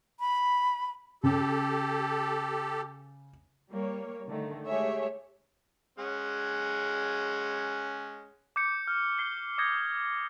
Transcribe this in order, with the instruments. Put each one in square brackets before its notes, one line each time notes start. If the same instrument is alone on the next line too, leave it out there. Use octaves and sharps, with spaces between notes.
[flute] B5
[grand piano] C#3 [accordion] G4 A4
[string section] G3 A#3 C#5
D3 D#3 A3
G#3 A3 G4 G#4 C#5 E5
[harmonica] G#3 C#4 F#5
[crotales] D6 G6 C#7
F6
G6 C7 G7
D6 D#6 G6 G#6 A#6 C#7